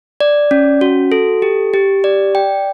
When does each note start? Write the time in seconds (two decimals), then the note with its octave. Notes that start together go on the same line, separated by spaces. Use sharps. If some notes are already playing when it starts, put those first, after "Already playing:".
0.21 D5
0.51 C#4
0.81 F#4
1.12 A4
1.42 G4
1.74 G4
2.04 D5
2.35 G5